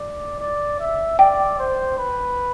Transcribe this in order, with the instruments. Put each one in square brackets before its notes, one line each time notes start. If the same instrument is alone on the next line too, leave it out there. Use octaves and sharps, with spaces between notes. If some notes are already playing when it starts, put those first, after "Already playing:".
Already playing: [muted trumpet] D5
D5
E5
[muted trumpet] D5 [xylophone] G5
[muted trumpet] C5
B4